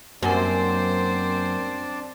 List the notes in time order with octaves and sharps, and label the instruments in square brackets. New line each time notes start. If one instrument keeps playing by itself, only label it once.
[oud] F#2 [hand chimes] A#3 A#4 [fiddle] C4 C5 [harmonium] D4 D5